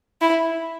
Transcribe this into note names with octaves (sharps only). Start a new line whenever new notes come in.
E4